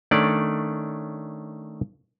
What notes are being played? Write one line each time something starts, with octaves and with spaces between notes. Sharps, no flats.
D#3 A3 C#4 D4 C#5 D5